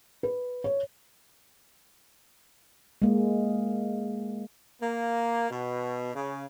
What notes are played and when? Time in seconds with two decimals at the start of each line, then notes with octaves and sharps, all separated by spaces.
0.23 B4
0.64 C#5
3.02 G#3 A#3
4.81 A#3
5.50 B2
6.15 C#3